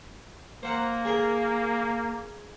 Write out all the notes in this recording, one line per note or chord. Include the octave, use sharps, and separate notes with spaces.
A#3 C5 F#5 A#5
G#4 A#4